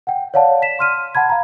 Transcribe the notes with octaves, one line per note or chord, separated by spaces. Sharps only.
F#5 G5
C#5 D5 F5 F#5 A5
B6 E7
C6 F6 D#7
F#5 A5 B5 G#6
F5 A#5